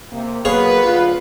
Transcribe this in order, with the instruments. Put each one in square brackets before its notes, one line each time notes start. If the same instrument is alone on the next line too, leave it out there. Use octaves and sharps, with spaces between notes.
[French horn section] C3 A#3
[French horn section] F#3 A#3 [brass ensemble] B3 B4 [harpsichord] G#4 C#5 F5
[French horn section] D2 F4